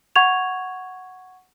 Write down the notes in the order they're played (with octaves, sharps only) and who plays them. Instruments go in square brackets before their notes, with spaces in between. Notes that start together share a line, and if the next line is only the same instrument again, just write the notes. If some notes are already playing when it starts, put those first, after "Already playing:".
[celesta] F#5 C#6 G#6 F7